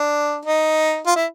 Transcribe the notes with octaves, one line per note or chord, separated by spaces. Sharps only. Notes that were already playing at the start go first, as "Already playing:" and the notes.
Already playing: D4
D#4
F4
E4